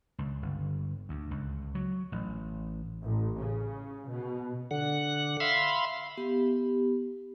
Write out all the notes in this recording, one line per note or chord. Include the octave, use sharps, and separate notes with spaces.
C#2
G1
D2
C#2
F#3
A1
A1
C#3
B2
D3 F#5
E5 F5 B5 C6
B3 G4